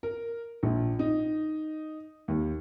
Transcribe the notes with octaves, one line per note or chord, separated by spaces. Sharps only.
A#4
A#1
D#4
D#2